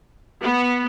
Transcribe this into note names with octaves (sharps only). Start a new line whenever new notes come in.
B3